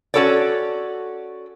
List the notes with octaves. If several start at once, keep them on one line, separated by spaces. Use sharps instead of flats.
C#4 F#4 A4 C#5 D5